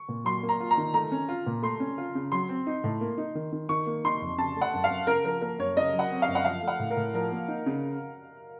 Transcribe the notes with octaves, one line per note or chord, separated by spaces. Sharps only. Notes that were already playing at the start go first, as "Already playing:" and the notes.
Already playing: C#6
A#2
F#3 C6
A#3
A#5
F4
A#5
D#3
A3 A#5
C#4
F4
A#2
A3 C6
C#4
F4
C#3
F#3 C6
C4
D#4
A2
A#3
D#4
D#3
D#3
D#3 C#6
A#3
D#4 C6
F2
C#3 A5
A3
F#5
F#2
F5
F#2
C#3 A#4
F3 A#4
A#3 A#4
F#2 C#5
C#3 D#5
F#3
F#5
C4
F5
F#2
F#5
F3 F5
A3
F#5
A2
A#4
A2
F3 A#4
A#3
D#4
C#3